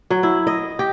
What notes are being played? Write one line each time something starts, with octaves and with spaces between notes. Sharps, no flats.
F#3
E4
D#5
G4